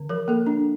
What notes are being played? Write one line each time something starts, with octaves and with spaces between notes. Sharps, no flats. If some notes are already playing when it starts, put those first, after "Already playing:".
Already playing: D3
F3 A#4
A#3 A4
D4